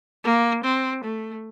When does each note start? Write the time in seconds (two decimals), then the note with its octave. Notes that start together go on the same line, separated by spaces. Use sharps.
0.24 A#3
0.65 C4
1.04 A3